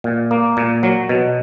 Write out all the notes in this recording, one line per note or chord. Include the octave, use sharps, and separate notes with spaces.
A#2
A#3
A#2
F#3
B2